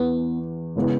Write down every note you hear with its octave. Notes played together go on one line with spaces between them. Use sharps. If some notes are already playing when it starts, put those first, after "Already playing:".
Already playing: E2 B3
C#3 G#3 B3 E4